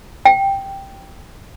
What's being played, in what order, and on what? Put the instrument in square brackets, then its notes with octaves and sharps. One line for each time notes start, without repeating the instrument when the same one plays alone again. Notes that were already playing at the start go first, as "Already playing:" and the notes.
[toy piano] G5